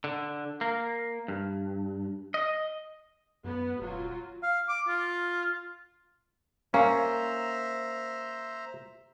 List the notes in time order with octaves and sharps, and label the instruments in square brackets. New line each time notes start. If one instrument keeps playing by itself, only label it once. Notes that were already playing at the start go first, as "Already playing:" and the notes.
[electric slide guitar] D3
A#3
G2
D#5
[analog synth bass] F#2 [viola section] B3
[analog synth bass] D#1 [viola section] F#3 F4
[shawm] F5
D6
F4
[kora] A#3 [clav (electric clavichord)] C#4 [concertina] C5 E5 A#5